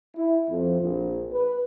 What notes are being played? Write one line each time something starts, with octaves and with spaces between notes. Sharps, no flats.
E4
F2
A#1
B4